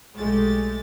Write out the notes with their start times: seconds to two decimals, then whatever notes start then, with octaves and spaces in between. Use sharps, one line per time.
0.16 B1 G#3 A3 G4 A6